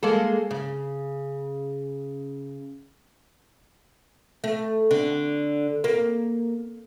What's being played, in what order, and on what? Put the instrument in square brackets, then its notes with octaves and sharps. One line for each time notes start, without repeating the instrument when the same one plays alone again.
[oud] G#3 A#3 A4
C#3
A3
D3
A#3